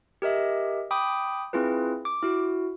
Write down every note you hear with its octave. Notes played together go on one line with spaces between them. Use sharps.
G4 A#4 D#5 E5
G5 B5 D6 D#6
C4 E4 F4 G#4 B4
D6
E4 F#4